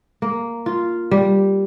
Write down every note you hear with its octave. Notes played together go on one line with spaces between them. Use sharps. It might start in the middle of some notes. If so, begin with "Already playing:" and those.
A#3
F4
G3